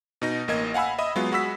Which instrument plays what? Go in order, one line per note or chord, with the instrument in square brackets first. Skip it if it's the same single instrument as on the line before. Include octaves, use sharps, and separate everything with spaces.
[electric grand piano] B2 D#4 A#6
A1 A#3 D#5 G#6
F5 F#5 G#5 B5 E6
D#5 E5 B5 D#6
F#3 G#3 B3 F4
G#3 F#4 B5 E6 B6